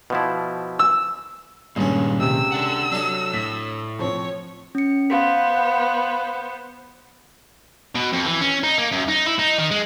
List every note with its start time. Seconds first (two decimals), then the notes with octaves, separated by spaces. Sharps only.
0.10 B2 F3 E4
0.79 E6
1.76 C#2 G2 A#2 D#3 C#4
2.20 C3 E6
2.52 D4 F#5
2.92 F#3 D4 A4 D#5
3.34 A2 B6
3.99 F3 C4 C#5
4.75 C#4 C#7
5.10 B3 C5 F5 C6 B6
7.95 B2
8.13 F2
8.26 E3
8.41 C#4
8.63 D#4
8.78 A#3
8.92 F#2
9.08 D#4
9.26 E4
9.39 D#4
9.58 D#3
9.71 G#3